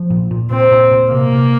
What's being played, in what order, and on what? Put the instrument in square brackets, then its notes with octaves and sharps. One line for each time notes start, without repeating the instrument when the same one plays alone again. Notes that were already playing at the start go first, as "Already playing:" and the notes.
Already playing: [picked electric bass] F3
A#2
A#2
[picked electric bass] A#2 [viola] C4
[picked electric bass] A#2
A#2
[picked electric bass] C3 [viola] A#3
[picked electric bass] C3